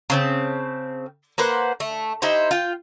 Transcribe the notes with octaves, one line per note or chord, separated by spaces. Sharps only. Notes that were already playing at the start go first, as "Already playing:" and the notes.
C#3 C4 A5
A#3 B4 C5 F#5
A3
D#4 E4 G4 C5
F4 G5